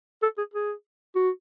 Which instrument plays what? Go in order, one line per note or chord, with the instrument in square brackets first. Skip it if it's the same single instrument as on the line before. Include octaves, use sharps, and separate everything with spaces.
[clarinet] A4
G#4
G#4
F#4